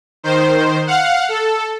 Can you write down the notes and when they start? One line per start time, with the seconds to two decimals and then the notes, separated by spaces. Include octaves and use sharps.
0.23 D#3 C5
0.87 F5 F#5
1.29 A4